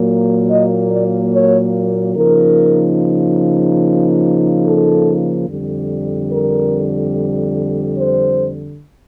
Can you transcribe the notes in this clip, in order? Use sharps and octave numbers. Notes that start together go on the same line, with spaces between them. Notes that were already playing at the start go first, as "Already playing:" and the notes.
Already playing: A#2 F#3 A#3
D#5
D5
C#5
C#3 F3 A#3 D#4 A#4
A4
F2 D3 G3
A#4
C5